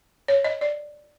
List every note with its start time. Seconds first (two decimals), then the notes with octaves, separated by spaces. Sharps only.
0.28 C#5
0.44 D#5
0.61 D5